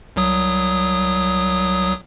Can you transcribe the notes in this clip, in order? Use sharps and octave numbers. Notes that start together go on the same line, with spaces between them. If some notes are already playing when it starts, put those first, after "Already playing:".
C2 F#3 D#6